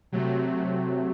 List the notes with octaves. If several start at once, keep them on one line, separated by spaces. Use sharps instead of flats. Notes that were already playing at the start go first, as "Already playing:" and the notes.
C3 F#3 A3